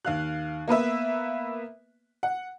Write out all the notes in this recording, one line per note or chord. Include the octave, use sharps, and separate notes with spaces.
D#2 F5 F#6
A#3 B3 B4 E5
F#5